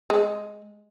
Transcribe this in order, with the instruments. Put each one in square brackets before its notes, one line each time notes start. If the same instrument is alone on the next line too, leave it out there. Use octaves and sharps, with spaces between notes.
[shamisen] G#3